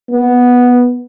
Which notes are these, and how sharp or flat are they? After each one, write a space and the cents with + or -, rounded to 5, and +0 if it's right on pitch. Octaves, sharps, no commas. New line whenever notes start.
B3 -5